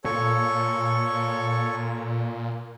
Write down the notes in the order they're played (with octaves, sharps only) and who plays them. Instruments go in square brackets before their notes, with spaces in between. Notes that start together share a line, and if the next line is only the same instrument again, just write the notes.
[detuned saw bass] A#2 [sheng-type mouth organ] A4 C#5 C#6